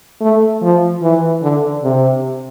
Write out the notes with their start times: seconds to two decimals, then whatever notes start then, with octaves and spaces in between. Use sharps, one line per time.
0.21 A3
0.62 F3
1.02 E3
1.43 D3
1.83 C3